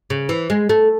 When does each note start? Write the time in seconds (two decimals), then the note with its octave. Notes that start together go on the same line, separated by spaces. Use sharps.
0.10 C#3
0.29 E3
0.50 G#3
0.69 A3